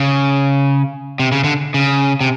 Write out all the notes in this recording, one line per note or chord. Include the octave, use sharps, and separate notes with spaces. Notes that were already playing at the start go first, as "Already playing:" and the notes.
Already playing: C#3
C3
C#3
D3
C#3
C3